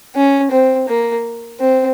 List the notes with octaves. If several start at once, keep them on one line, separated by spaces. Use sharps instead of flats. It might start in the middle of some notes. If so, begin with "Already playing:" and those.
C#4
C4
A#3
C4